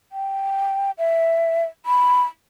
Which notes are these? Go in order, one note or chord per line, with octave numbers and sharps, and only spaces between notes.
G5
E5
B5